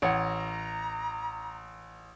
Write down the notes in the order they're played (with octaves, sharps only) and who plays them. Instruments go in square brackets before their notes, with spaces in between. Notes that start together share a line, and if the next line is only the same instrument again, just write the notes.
[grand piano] A1 [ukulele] C#5 F#5 [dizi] A#5